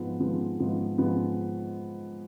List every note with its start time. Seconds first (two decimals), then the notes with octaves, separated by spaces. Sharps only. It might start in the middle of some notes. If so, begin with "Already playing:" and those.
Already playing: G#2 F3 G#3 B3
0.20 G#2 F3 G#3 B3
0.60 G#2 F3 G#3 B3
0.98 G#2 F3 G#3 B3